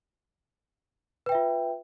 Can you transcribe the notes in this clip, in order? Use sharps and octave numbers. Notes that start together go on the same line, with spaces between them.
F4 B4 E5 G5